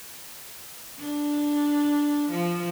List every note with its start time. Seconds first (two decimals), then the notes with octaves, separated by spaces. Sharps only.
0.99 D4
2.30 F3